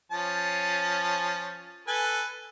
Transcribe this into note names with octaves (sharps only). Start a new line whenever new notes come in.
F3 C#4 A5
A4 B4 G#5